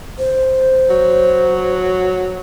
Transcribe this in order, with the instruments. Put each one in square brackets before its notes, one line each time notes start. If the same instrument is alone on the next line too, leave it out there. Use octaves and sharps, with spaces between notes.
[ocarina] C5
[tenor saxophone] F#3